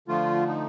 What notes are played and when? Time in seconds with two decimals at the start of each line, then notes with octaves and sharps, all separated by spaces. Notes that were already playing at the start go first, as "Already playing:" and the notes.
0.08 D3 F3 A3 F4
0.47 D#4